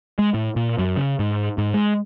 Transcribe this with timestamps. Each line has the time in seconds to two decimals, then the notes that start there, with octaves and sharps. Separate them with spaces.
0.19 G#3
0.34 A2
0.56 A#2
0.78 F#2
0.97 C#3
1.19 G#2
1.58 G#2
1.74 G#3